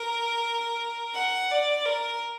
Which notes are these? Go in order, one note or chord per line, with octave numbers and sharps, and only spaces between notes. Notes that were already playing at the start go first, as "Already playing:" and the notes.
Already playing: A#4
F#5
D5
A#4